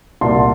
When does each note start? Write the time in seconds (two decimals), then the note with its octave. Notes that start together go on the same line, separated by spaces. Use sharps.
0.21 C2 A#2 A5 C6
0.35 A5